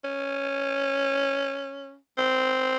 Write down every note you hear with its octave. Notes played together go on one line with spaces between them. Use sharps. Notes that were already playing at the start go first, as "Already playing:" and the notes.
C#4
C4